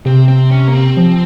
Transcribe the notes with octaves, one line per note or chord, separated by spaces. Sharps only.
C3 C4
C4
C#4
A#3
C4
F3